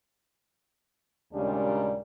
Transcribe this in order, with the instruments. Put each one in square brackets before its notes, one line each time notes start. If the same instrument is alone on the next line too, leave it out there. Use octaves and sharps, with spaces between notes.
[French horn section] D#2 A#2 C#3 G3 G#3 D4